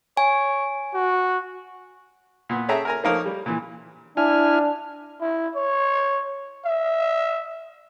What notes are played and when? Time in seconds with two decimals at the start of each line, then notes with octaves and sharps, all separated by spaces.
0.17 C#5 G#5
0.94 F#4
2.49 A#2 B3
2.69 C#4 G#4 A4 E5 G5 A#5
2.85 A#4 G#5 A#5
3.04 F3 A3 A#3 D#4 A#4 C#5
3.25 G3
3.46 A#2 E3
4.17 D4 E4 G#5 F6
5.21 E4
5.55 C#5
6.65 E5